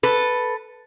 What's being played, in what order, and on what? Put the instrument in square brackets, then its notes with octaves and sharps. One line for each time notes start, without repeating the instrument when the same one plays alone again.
[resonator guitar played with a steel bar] A4 B4